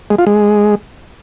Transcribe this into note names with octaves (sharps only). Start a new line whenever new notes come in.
G#3
F4
G#3